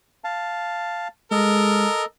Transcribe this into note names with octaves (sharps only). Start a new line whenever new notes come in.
F5 A5
G#3 A4 A#4 D#5